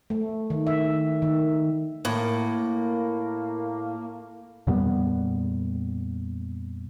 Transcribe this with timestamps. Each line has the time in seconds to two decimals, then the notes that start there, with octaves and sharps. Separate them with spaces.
0.10 A3
0.50 D#3
0.67 E5
1.22 D#3
2.05 A2 A#3
4.67 F2 A#2 G3 B3